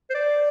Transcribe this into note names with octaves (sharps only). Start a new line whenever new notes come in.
C5
D5